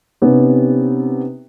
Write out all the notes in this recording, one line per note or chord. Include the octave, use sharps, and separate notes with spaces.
C3 B3 C#4 D#4 G4